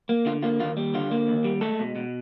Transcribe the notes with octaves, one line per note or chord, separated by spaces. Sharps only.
A#3
D3 F4
A#3 F4
D#2 F4
G3
D3 F4
A#3
D#2
G3
G#3 A3 A4
B2
B2